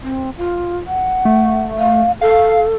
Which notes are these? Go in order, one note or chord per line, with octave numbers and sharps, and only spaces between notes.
C4
F4
F#5
A3
F5
A4 F5